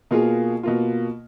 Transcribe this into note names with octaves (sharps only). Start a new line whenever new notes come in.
B2 A#3 F4 G#4
B2 A#3 F4